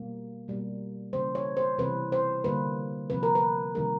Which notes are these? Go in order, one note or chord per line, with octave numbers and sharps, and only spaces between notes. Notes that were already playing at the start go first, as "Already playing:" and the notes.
Already playing: B2 G3 A#3
B2 G3 A#3
C#3 E3 G3 A#3 C5
C#5
C5
C3 E3 G3 B4
C5
D3 G3 A#3 B4
C3 F3 A#3 B4
A#4
B4
C3 D#3 G3 A#3 A#4